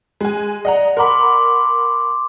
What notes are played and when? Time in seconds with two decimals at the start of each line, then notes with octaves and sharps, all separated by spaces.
0.21 G#3 G#5
0.65 D5 D#5 F#5 A#5
0.97 A#4 F#5 B5 C6 D6